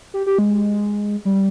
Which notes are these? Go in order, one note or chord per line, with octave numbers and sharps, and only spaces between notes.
G4
G4
G#3
G3